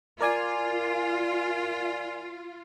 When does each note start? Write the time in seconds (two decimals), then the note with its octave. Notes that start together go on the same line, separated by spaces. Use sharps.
0.21 F4 A#4 D5 G#5